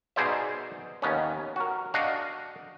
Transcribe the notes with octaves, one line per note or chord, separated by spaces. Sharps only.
B2 D#4 G#4 C5 D5 E5
D#2 B3 C#4
F#4 A#4
D4 F#4 D#5 F5